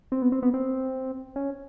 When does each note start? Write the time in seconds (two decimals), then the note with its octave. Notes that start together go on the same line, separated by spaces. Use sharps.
0.12 C4
0.22 B3
0.32 C4
0.42 B3
0.54 C4
1.36 C#4